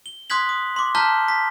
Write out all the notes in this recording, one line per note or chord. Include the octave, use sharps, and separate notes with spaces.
G7
C6 D#6 F#6 G#6 B6 F#7
D#6
C6 D6
A5 A#5 F6 G6 B6 G7
B6